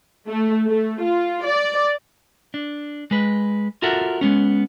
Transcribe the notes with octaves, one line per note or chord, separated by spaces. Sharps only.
A3
A3
F4
D5
D4
G#3 B4
F4 F#4 A4 A#4 E5 F#5
G#3 B3 C#4